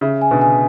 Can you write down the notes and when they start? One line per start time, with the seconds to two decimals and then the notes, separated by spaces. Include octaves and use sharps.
0.01 C#3 E5
0.21 G#5
0.31 B2 D3
0.41 G#5